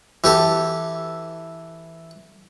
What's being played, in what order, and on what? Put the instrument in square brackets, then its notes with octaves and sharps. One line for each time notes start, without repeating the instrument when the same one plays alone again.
[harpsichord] E3 G4 A4